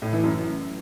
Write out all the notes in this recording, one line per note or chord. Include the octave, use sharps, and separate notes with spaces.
A2
E3
F#2